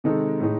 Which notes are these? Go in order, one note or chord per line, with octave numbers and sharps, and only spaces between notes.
C3 D#3 G#3 D#4 A4
A2 G#3 D#4